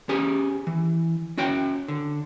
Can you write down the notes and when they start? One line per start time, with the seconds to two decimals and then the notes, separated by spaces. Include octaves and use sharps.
0.09 C#4 G4 G#4
0.67 E3
1.38 C#4 F#4 C#5 G5
1.88 D3